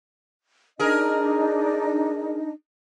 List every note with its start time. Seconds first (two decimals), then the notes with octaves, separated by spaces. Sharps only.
0.79 D4 D#4 G#4 A#4 D#5